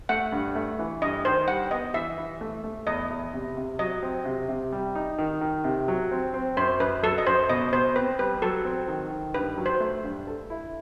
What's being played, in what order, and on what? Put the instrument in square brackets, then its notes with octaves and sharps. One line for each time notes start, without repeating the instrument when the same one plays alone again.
[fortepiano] A3 [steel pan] F#5
[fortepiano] G2
A3
E3
[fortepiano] G2 [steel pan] D#5
[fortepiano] D#3 [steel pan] C5
[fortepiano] G3 [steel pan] F#5
[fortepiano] B3 [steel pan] D#5
[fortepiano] E3 [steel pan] E5
[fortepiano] E3
A3
A3
[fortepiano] E2 [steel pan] D#5
[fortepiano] E2
C3
C3
[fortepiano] F#3 [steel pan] D#5
[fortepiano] C4
C3
C3
G3
D#4
D#3
D#3
C3
F#3
C4
C4
[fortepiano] F#2 [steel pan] C5
[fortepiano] F#2 [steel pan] B4
[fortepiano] F#3 [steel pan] A4
[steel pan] D#5
[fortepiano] F#2 [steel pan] C5
[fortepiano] B2 [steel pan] D#5
[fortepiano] B2 [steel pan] C5
[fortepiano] C4 [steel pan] B4
[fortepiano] G3 [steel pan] B4
[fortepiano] F#3 [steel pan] A4
[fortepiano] C4
D#3
D#3
[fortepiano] G2 [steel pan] B4
[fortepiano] F#3
[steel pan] C5
[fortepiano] A3
G2
A4
E4